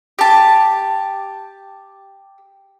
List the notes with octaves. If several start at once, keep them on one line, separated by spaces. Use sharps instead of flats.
G4 A5